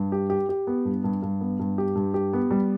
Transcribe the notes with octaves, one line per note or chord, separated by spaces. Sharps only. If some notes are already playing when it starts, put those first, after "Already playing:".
Already playing: G2
G4
G4
G4
B3
G2
G2
G2
B3
G2
G4
G2
G4
B3
G3